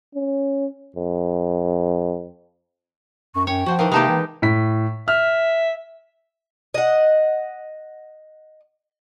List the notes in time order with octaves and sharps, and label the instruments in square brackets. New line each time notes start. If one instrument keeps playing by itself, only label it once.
[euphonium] C#4
F2
[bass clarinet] F#2 [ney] C#6
[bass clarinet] F#2 [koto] C#5 [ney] G5
[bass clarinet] F3 [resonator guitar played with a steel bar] F#4 C5 F#5
[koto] D#3 E3 [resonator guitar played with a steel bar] F5
[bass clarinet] C3 [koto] G#3 D#4 G4 [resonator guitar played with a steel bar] A#3 A5 A#5
[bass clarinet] E3
[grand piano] A2 B6
[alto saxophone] E5 [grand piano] F6
[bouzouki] D#5 F#5